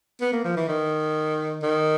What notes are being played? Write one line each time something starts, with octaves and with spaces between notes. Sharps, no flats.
B3
A#3
F3
E3
D#3
D#3